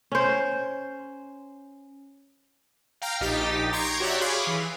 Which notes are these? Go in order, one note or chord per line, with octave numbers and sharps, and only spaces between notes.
C#4 C5
F5 G5 A#5 F6
A#1 D#4 G4 A6 B6
A#5 C6 C#6 G6 G#6 D7
F#4 G4 C#5 D5 E5 F#6
G#4 C#5 F5 B5 C6 D6
E3